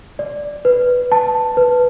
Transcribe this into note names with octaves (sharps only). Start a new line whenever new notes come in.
D5
B4
A5
B4